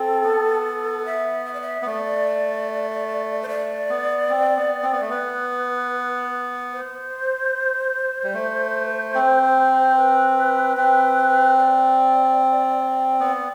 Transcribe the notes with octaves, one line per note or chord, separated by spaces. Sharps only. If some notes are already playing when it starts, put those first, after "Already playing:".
Already playing: C4 A4
B3
E5
E5
D5
E5
B3
A3 D5
C5
A3 D5
B3
C4
B3
C4
B3
A3
B3 B4
C5
G3
A3
C4
B4
C4
D5
B3 D5